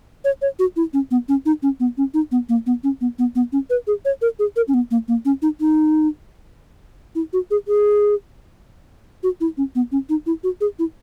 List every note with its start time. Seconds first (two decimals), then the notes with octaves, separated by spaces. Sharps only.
0.25 C#5
0.42 C#5
0.59 F#4
0.76 E4
0.93 C#4
1.11 B3
1.29 C#4
1.46 D#4
1.63 C#4
1.80 B3
1.98 C#4
2.14 D#4
2.32 B3
2.49 A#3
2.66 B3
2.84 C#4
3.01 B3
3.19 B3
3.35 B3
3.52 C#4
3.70 B4
3.87 G#4
4.05 C#5
4.22 A#4
4.39 G#4
4.56 A#4
4.68 C#4
4.74 B3
4.91 A#3
5.08 A#3
5.25 C#4
5.42 D#4
5.61 D#4
7.15 E4
7.33 F#4
7.51 G#4
7.68 G#4
9.23 F#4
9.41 E4
9.57 C#4
9.75 B3
9.92 C#4
10.09 D#4
10.26 E4
10.44 F#4
10.61 G#4
10.79 E4